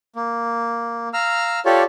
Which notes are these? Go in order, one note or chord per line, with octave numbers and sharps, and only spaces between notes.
A#3
F5 A#5 E6 F6
F4 G4 A4 C#5 D5